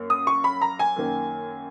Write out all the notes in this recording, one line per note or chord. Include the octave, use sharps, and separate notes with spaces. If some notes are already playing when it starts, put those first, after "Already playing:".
Already playing: F#2 A#3
D#6
C#6
B5
A#5
G#5
F#2 D#3 A#3